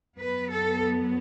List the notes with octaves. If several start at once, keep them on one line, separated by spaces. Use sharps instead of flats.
F#2 F#3 B3 B4
A4